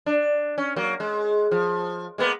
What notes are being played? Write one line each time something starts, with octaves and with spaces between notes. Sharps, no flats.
D4
C#4
F#3 A#3
G#3
F3
G#3 A#3 B3